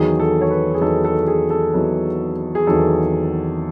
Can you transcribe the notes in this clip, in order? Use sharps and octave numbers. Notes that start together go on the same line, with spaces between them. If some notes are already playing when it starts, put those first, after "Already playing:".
Already playing: E2 D#3 F#3 G#4
A4
C#5
B4
G#4
E2 D#3 F#3 A4
A4
G#4
A4
E2 D#3 F#3
G#4
E2 D#3 F#3 A4